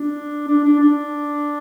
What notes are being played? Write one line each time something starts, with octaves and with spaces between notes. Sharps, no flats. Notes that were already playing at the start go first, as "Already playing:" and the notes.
Already playing: D4
D4
D4
D4